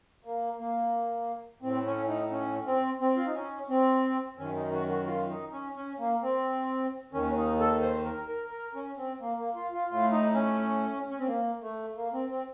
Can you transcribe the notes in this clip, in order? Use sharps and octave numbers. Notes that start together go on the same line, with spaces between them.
A#3
A#3
A2 C4
C#4
D#4
C#4
C4
C4
F4
D#4
C#4
C4
F#2 D#3 C#4
D#4
F#4
F#4
F4
D#4
C#4
C#4
A#3
C4
D#2 D#3 C#4
D#4
A4
C5
A#4
A#4
A#4
C#4
C4
A#3
A#3
F4
F4
A2 F4
D#4
C#4
C#4
C4
A#3
A3
A#3
C4
C4